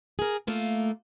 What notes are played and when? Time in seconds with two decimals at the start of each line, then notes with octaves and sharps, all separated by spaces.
0.19 G#4 A#4
0.47 A3 A#3 F4